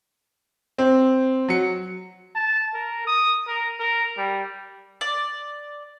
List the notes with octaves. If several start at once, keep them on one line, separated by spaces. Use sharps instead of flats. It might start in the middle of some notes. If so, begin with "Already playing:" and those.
C4
F#3 C#7
A5
A#4
D#6
A#4
A#4
G3
D5